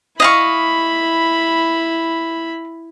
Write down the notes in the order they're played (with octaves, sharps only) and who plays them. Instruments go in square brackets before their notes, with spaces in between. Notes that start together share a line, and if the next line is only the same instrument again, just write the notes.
[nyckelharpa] E4 B5 [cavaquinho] D#5 F5 C#6